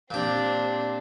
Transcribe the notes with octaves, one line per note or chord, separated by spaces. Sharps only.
A#2 C4 D4 G4